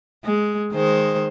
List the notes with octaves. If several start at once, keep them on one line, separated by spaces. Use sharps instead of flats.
G#3
D#3 G#3 C5